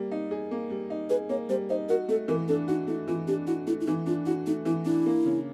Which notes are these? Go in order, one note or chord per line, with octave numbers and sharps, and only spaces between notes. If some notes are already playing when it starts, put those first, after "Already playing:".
Already playing: G3 A#3
D#4
G#4
A#3
G3
D#4
G#4 B4
A#3 C#5
G3 C5
D#4 C5
F#4 A#4
A3 A4
E3 A#4
D4 A4
D#4 F#4
A3 E4
E3 F4
D4 G4
E4 F#4
A3 E4
E4
E3 D#4
D4 F4
E4 F#4
A3 D#4
E3 E4
D4 E4
A#3
C#3